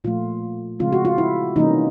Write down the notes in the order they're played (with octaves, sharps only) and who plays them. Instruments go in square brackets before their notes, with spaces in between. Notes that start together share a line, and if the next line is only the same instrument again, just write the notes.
[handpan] A#2 F3 A3 F4
C#3 F3 G#3 C4 F4
F#4
F4
E4
C3 E3 G3 A#3 C#4 D#4